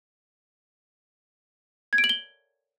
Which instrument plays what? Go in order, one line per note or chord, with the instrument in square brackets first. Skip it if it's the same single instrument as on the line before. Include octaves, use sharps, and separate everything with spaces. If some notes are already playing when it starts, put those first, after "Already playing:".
[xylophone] G#6
D7
F#7
G7